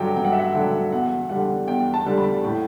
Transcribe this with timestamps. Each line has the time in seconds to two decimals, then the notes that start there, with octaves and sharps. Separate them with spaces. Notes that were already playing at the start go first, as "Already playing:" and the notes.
Already playing: G2 D3 F#3 G5
0.16 G2 G5
0.25 F#5
0.32 E5
0.40 F#5
0.54 D3 F#3 G5
0.92 E2 F#5
1.29 D3 G3 F#5
1.67 E2 G5
1.94 A5
2.06 D3 G3
2.18 B5
2.44 A2